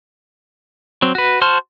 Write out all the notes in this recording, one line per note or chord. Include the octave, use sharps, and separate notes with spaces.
F#3 C4
F#4 B4
F#4 C5 A5 C6 F6